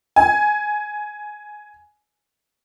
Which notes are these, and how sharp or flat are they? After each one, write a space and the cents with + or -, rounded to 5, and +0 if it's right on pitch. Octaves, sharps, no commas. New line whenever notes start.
G#5 +10